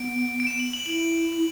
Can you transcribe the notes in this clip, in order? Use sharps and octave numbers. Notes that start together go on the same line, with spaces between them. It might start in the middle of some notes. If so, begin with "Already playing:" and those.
Already playing: B3 D7
D7
E7
F#7
F#7
E4 F#7